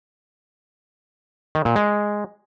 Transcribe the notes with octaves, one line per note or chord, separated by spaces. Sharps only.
D#3
A#2
G#3